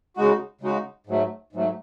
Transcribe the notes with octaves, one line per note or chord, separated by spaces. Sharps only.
C#3 G#3 D#4 F#4
C#3 G#3 D#4 F#4
G#2 F#3 A3
G#2 F#3 A3